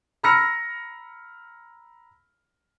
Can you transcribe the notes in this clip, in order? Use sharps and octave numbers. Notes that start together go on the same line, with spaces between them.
A#5 B5 E6 F6 A#6 C#7